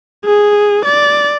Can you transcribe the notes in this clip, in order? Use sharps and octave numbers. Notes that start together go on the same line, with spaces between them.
G#4
D5